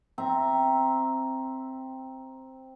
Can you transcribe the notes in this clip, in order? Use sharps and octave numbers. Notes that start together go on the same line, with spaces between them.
C4 E5 A#5